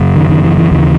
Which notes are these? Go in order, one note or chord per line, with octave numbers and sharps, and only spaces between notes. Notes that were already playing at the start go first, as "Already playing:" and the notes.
Already playing: F#2 C#3
D#3
D#3
E3
E3
D#2 C#3 E3